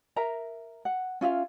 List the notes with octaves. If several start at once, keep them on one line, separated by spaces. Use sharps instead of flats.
A#4 E5 A#5
F#5
C#4 F4 E5 F5